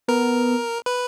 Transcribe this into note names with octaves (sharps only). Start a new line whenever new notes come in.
B3 A#4
B4